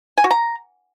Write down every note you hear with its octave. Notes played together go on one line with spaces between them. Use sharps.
G#5
F#4
A#5